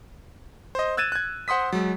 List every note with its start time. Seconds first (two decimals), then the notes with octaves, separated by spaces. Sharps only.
0.75 C5 D#5
0.97 E6 F#6 G#6 A6 D#7 E7
1.12 F#6 G#6
1.48 C5 F#5 C6 D#6 B6
1.73 F#3 G#3